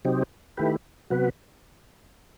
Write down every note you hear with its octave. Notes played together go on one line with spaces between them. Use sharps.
C3 F#3 C4 D#4 G4
D#3 A3 E4 G4 B4
C3 F#3 B3 F#4 B4